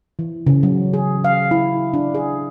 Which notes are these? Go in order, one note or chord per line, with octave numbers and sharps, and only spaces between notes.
E3
C#3
F#3
G#4
F5
E4
D4
G#4